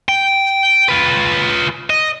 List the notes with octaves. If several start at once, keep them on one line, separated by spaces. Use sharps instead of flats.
G5
F4 B4
D#5